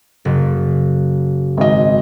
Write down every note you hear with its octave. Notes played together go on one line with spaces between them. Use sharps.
F#1
G#1 D#5